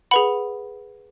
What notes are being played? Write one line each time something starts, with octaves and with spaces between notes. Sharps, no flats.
G#4 B4 F#5 B5